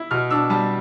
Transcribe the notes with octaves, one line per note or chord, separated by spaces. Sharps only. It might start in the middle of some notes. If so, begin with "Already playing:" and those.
Already playing: E4
B2 F6
D4 E6
G3 A5